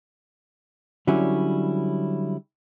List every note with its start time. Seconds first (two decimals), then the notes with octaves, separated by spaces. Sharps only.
1.07 D3 F#3 G3 C#4 E4